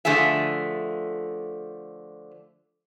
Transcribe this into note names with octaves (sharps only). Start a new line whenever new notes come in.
D3 F3 A3 G#4 E5